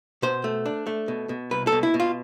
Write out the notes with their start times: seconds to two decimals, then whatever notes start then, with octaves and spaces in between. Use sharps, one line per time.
0.22 B2 C5
0.44 A3
0.66 D4
0.87 A3
1.08 B2
1.29 B2
1.51 C2 B4
1.67 A4
1.72 B2
1.83 E4
1.94 B2
2.00 F4